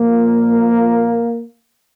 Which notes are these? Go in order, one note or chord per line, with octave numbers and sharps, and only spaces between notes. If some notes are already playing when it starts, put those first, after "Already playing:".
Already playing: A#2 F3 A#3